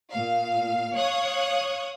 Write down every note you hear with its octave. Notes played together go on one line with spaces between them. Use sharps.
A#2 F5
C#5 F5 C#6 D#6 F#6 G#6